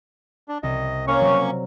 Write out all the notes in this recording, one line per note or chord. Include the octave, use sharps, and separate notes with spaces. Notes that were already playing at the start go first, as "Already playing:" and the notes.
D4
C2 D#5
A#3 C#4 C#5 F5 A#5 C#6
C3 F#3